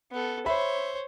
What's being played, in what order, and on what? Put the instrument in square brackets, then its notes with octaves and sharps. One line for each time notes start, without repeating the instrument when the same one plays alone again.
[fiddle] B3 A4
[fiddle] C5 C#5 [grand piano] E5 B5